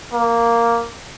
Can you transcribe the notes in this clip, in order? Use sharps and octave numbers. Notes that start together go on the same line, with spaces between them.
A#3